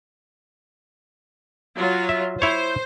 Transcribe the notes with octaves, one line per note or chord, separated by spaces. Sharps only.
F#3 F4
E5
E4 C5 C#5